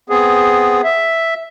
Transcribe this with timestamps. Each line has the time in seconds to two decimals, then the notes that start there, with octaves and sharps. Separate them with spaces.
0.10 B3 C4 G#4
0.84 E5